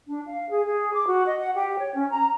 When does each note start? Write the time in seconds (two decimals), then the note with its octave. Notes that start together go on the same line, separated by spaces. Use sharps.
0.08 D4
0.27 F5
0.50 G#4
0.66 G#4
0.94 D6
1.07 F#4
1.26 D#5
1.40 F#5
1.54 G4
1.78 C#5
1.95 C#4
2.11 A#5